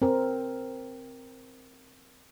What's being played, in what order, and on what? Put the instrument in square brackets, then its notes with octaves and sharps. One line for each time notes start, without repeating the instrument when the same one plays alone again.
[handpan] C4 A#4